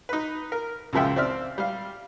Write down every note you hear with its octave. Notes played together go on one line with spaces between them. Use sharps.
D#4 B4
A#4
C#2 F#2 C#3 F3 E5 G5
C4 C5 D5 E5 F6
G3 F5